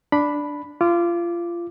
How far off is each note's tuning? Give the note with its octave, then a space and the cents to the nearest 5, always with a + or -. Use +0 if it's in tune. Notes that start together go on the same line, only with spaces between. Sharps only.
D4 +0 B5 +0
F4 -25 D6 +0